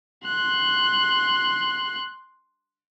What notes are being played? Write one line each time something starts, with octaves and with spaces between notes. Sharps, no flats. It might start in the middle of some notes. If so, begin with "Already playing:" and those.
C6 F#6